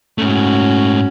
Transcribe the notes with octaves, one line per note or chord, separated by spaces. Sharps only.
G#2 A3 C#4 F#4